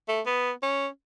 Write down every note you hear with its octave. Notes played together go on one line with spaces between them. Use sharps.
A3
B3
C#4